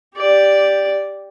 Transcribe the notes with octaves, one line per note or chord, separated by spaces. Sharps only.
G4 D5